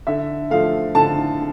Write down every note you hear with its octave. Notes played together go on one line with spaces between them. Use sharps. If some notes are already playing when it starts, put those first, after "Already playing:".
D3 E5
F3 A3 F5
D3 A5